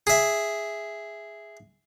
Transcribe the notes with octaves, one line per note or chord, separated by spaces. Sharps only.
G#4 E5